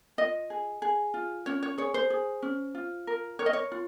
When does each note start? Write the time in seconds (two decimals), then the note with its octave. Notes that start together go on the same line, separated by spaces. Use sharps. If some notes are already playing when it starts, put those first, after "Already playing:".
0.18 F4 D#5
0.50 G#4
0.82 G#4
1.14 F4
1.46 C#4 C#5
1.63 C#5
1.78 G#4 C#5
1.94 C5
2.10 G#4
2.42 C#4
2.75 F4
3.07 A#4
3.39 A#4 C#5
3.46 D#5
3.53 C#5
3.72 F4